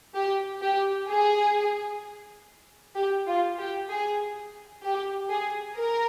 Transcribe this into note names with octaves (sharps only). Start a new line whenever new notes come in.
G4
G4
G#4
G4
F4
G4
G#4
G4
G#4
A#4